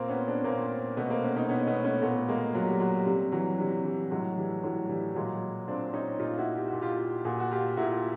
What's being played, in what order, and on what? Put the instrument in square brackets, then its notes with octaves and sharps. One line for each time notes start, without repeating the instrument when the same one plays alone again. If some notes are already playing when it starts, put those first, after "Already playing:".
Already playing: [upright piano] A#2 A#3 C4
B3 C#4
C4 D4
A#2 A#3 C4
B2 A3 B3
A#3 C4
B3 C#4
C#4 D#4
B2 B3 C#4
A3 B3
B3 C#4
A#2 A3 B3
G#3 A#3
A#2 F#3
G3
F#3
G3
C3 G3
E3 F#3
C3 G3
E3 G3
A2 F#3 G#3
E3 G3
A2 F#3
E3 G3
A#2 F#3 G#3
A#2 C4 D4
C#4 D#4
A#2 D#4 F4
E4 F#4
G4
A#2 F#4
F4 G4
A#2 F#4 G#4
F#4
F4 G4
A#2 E4 F#4